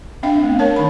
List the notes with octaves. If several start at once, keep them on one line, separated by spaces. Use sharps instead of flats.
C4 D4 E5 F5 G5
A3 B3
A#4 C#5 A5
D#3 D#4 B5